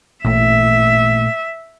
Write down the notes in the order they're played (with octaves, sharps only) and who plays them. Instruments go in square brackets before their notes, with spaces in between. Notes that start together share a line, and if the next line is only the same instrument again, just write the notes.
[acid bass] A1 [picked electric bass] A#2 A3 [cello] E5